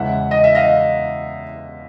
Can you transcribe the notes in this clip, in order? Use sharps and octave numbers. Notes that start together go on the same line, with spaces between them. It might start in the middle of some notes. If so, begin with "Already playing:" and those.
Already playing: E2 C#3 E3 G#3 E5 F#5
D#5
E5
D#5 F5